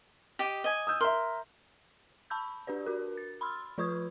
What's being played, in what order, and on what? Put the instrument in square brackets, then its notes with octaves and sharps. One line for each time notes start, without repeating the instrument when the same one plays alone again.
[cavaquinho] G4 D#5
D#5 G#5
[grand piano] D#6 E6 G6
[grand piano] A#4 E5 [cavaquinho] C6
[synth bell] A5 B5 C#6 E6 G6
D4 G4 B4 D5
F#4 A#4
A6
B5 C6 E6 F6
F3 F4 B4 C#6 D#6 G#6